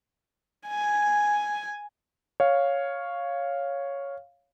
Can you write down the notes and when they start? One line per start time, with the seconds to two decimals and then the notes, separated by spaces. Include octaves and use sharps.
0.68 G#5
2.40 C#5 F5